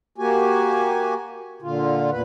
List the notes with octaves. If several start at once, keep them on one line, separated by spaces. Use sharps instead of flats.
A#3 F#4 G4 G#5
A#2 D3 F4
E2 A#2 B4